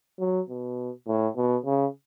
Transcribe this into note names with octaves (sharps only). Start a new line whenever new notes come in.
F#3
B2
A2
B2
C#3